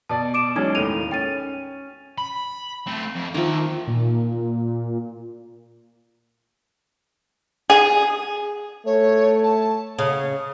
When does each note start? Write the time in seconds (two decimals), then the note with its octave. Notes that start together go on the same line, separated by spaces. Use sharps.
0.09 B2 D5 A5
0.34 D6 D7 E7
0.56 F#3 G#3 C#4 D#4 G#6
0.75 D#2 A2 D#7 F7
1.11 C#4 G5 A6 D#7
2.18 B5
2.86 A3 C4
3.15 F2
3.34 D#3 F3 A#3 E5
3.87 A#2
7.70 G#4
8.86 A3 C#5
9.43 A5
9.98 C#3